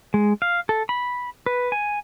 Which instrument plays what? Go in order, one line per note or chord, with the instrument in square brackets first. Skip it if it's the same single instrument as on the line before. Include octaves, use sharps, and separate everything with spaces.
[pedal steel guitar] G#3
F5
A4
B5
B4
G#5